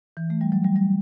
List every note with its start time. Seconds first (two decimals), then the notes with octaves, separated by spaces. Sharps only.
0.17 E3
0.30 A3
0.41 G3
0.52 F#3
0.64 G3
0.76 G3